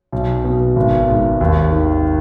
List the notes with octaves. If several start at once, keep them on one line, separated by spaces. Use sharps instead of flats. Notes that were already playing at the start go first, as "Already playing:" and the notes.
B1
B2
G#1
G#2
D#2
D#3